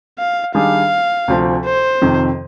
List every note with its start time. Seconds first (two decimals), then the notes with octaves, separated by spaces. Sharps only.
0.18 F5
0.55 D#3 G3 D4 G#4 F5
1.28 D2 C3 F3 C4
1.65 C5
2.02 F2 C3 D#3